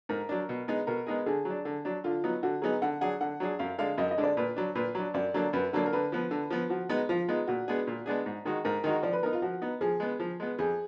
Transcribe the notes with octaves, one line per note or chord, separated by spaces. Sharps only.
G#2 A#4
F#3 D4
B2
G#3 B3 D#4 G#4
B2 A#4
G#3 B3 D#4 G#4
D3 G#4
F#3
D4
D3
F#3 D4
D3 F4
F#3 B3 D#4
D3 F#4
F#3 B3 D#4 G#4
D3 F#5
F#3 D4 G#4 F#5
D3 F#5
F#3 D4 G#4
F#2 F5
D3 G#3 D4 F5
F#2 D#5
D#5
D3 G#3 D4
D5
A#2 B4
F#3 D4
A#2 B4
F#3 D4
F#2 D5
D3 F#3 A#3 D4
F#2 B4
D3 F#3 A#3 D4
A#4
D3 B4
F3 B3
D3
F3 B3
F3 F#4
G#3 B3 D#4
F3 F4
G#3 B3 D#4
A#2 F#4
G#3 B3 D4 G#4
A#2
G#3 B3 D4 G#4
G#2
D#3 G#3 D#4 F#4
G#2 A#4
D#3 G#3 D#4 F#4
F3 D5
B4
B3 D#4 A#4
F4
F3 F#4
B3 D#4
F3 G#4
G#3 B3
F3
G#3 B3
F2 G#4